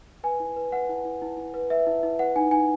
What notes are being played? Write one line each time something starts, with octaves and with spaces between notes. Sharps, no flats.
B4 G#5
E4
B4
B4 F#5
E4
E4
E4
E4
B4
B4 E5
E4
E4
B4 F#5
D#4 G#5
D#4 G#5